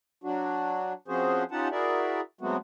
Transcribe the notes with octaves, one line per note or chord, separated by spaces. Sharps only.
F#3 D4 F#4
F3 C4 C#4 F#4 G#4 C5
C#4 D#4 F4 G4 F#5 A5
E4 F#4 G#4 A#4 D5 E5
F#3 G#3 A3 B3 C4 F#4